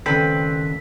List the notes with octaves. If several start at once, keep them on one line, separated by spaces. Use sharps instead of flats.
D#2 C#3 C4 A4 B4 D5 B6